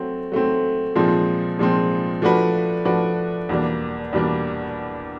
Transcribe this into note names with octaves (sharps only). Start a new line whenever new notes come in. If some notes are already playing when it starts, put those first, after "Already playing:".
Already playing: F#3 A3 C4
F#3 A3 C4
A#2 F3 G#3 C4
A#2 F3 G#3 C4
F3 A3 D4 F#4 B4
F3 A3 D4 F#4 B4
E2 B2 G3 A#3 D4
E2 B2 G3 A#3 D4